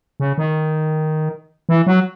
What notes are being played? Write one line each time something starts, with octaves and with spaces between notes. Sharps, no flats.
C#3
D#3
E3
F#3